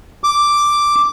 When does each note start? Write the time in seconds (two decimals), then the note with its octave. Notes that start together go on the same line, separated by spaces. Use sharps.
0.24 D6